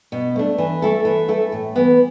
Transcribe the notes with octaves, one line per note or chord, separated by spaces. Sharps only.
B2
A3 D4
E3
A3 E4 A4
E3
A3 E4 A4
A2
E3 B3